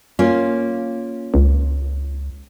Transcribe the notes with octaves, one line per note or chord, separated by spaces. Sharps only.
A#3 C#4 F4
C#2